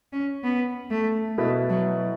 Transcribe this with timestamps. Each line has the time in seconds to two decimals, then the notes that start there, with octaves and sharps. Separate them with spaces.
0.13 C#4
0.44 B3
0.91 A3
1.38 B2 A3 B3 E4
1.69 F#3